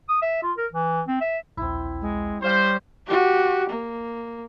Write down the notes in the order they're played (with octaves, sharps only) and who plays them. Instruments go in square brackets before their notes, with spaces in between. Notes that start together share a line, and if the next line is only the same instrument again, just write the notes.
[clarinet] D#6
E5
F4
A#4
E3
C4
E5
[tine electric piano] A#1 D#2 [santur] C4 E4
[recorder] G#3
[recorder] G3 [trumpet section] C5 [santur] C#5 F5 G5
[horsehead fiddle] F#4 G4
A#3